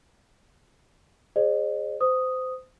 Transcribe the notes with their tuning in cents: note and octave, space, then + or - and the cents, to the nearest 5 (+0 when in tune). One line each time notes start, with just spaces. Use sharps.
G#4 +0 C5 +25 D#5 -45
C5 -25 D#6 +0